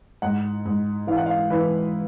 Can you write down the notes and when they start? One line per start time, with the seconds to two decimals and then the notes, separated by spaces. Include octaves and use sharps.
0.22 G#2 F#5
0.65 G#2
1.07 E3 F5
1.17 F#5
1.26 F5
1.50 E3 B4